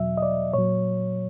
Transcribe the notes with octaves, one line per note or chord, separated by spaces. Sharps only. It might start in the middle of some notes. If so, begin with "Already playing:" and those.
Already playing: E2 B2 F#3 E5
D#5
D5
A#2 F#3 C#5